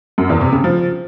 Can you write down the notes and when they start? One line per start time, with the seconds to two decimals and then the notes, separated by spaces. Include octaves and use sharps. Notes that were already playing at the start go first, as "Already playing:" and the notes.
0.18 F#2
0.29 E2
0.41 C3
0.52 C#3
0.64 F3